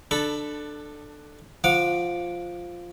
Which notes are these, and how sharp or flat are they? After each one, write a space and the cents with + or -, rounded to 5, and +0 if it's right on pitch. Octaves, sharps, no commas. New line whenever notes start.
D4 +20 A4 +0 B5 +0
F3 +0 F#5 -20 D6 +0